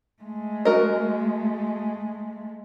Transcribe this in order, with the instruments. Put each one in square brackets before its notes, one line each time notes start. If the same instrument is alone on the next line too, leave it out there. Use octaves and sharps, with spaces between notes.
[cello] G#3 A3
[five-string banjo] F#4 A#4 D#5